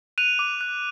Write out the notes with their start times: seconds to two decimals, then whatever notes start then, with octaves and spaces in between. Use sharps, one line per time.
0.18 F#6 D#7 F7
0.39 D6
0.61 F#6